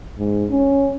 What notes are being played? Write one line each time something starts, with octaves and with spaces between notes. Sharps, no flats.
G#2
C#4